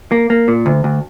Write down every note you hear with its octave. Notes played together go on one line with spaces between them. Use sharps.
A#3
A#3
A#2
D2
D2